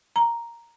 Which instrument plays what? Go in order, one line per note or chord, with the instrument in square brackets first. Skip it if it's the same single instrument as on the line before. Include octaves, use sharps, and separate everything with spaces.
[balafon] A#5